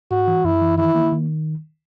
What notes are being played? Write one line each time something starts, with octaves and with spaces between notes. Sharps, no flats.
G#2 F#4
E3
F#2 E4
E3
D#3 E4
A#3
D#3